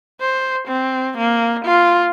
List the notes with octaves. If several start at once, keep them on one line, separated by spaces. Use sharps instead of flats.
C5
C4
A#3
F4